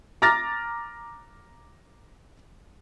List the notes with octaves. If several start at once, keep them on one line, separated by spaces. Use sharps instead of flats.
A#5 D6 F6 A6 A#6